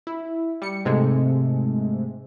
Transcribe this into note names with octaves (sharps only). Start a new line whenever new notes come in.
E4
G3 C#7
G#2 C3 G#3 A3